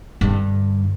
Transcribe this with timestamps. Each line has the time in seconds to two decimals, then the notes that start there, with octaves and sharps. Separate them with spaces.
0.21 G2 D3